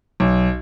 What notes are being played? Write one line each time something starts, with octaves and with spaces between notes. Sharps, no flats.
B1